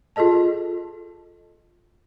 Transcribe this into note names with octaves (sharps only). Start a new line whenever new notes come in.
F4 G#4 A4 D#5 A5